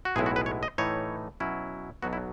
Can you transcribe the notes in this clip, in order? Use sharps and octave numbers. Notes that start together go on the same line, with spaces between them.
F#4
B1 A2 G#3 B3 E4 G#4
F#4
B4
C#5
D#5
A2 E3 A3 D#4 C#5
B2 F#3 C#4 E4
B1 B2 F#3 B3 F#4
E4